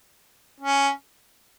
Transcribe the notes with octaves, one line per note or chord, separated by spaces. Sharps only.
C#4